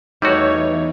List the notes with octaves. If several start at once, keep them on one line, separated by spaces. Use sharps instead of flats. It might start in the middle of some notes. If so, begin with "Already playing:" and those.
E2 E3 G3 A3 D#4 F#4 C#5